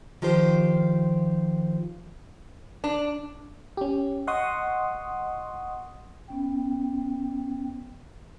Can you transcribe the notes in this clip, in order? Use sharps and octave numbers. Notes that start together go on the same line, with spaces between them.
D#3 F3 F4 G4 C5
D4
C#4 G4
D#5 F#5 C6 C#6 D#6
B3 C#4 G5